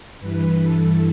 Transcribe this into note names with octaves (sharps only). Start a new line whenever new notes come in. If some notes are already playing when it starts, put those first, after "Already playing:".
G2 E3 B4
G2 E3 A4